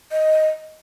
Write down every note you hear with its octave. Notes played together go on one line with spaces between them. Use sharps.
D#5